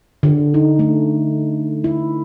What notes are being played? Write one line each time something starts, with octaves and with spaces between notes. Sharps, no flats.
D3
D#4
A3
E4